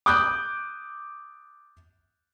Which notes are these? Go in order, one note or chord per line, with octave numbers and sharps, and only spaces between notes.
D6 D#6 F#6 G6